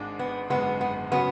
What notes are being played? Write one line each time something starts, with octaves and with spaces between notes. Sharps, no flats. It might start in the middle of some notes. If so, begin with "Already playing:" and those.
Already playing: G#1 G#2 G#3 D4
B3
G#1 F#2 D3 G#3 B3
B3
C#3 F#3 B3 C#4 F#4